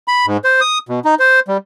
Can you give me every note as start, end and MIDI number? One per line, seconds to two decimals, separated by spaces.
0.08 0.26 83
0.26 0.37 44
0.44 0.61 72
0.61 0.78 87
0.89 1.00 47
1.05 1.15 63
1.19 1.40 72
1.48 1.57 55